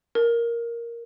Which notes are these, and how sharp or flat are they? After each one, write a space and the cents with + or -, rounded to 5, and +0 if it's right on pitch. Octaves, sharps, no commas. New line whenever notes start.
A#4 +5